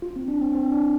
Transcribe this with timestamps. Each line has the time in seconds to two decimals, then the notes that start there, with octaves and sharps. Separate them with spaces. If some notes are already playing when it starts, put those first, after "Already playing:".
0.02 F4
0.16 C4
0.28 D4
0.41 C4
0.55 C4
0.72 D4